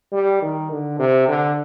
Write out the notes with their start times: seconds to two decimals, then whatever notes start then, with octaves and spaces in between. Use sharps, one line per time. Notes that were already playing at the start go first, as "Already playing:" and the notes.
0.12 G3
0.42 D#3
0.71 D3
0.99 C3
1.28 D3